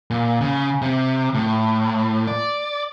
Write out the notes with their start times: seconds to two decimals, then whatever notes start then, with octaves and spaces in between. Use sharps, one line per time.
0.10 A#2
0.41 C#3
0.82 C3
1.34 A2
2.27 D5